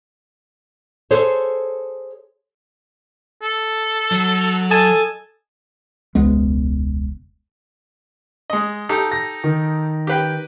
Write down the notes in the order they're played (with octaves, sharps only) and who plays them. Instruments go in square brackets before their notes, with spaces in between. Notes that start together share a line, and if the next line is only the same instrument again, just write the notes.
[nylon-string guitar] G#4 A4 C5 C#5
[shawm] A4
[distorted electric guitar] F#3
[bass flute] A4 [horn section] D#5 G#5 A5
[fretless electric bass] E1 C#2 G#3 B3
[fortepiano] G#3 D#5
D#4 G4 A4
[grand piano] A#6
D#3
[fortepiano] G4 B4 G5